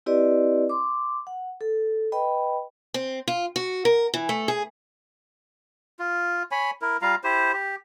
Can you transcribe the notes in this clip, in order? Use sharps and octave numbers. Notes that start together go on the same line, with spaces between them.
C4 E4 G4 B4 D5 D#5
C6 D6
F#5
A4
B4 D#5 G5 B5
C4
F4
F#4
A#4
E3
A3
G#4
F4
C#5 G#5 B5
E4 A#4
G3 F4 F5 A#5
E4 G4 C5
G4